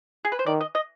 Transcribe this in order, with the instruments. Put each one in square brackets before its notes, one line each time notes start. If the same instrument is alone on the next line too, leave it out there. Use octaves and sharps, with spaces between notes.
[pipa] G#4
B4
C5
[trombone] D#3 [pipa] D5
[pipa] D#5
D#5